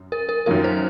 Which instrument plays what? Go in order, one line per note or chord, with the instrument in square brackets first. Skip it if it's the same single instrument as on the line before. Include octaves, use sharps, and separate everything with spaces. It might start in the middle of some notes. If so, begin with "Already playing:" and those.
Already playing: [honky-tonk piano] F#2
[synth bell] A#4
A#4
[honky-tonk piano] F#2 D#3 F#3 A#3 F4 [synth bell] A#4
[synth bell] C5